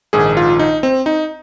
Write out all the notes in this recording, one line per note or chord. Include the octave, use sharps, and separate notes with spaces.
A#1 G#2 D#3 G#4
F4
D#4
C4
D#4